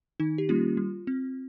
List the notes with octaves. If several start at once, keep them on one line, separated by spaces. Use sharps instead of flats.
D#3 D#4
G4
G3 A#3 C#4 F4
G3
C4